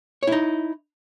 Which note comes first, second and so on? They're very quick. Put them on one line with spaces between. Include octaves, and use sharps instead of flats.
C#5 E4 D#4